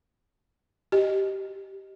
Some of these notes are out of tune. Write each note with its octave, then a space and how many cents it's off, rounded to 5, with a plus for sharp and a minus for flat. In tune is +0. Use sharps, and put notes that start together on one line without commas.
G4 -15 D#5 +0